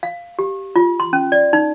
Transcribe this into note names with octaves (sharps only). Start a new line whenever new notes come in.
F5
G4
F4
C6
C#4
D5
D#4